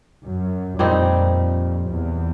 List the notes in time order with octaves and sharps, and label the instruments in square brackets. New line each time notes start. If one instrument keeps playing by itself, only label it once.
[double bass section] F#2
[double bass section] F2 [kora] A#2 G3 C4 D#4
[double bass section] E2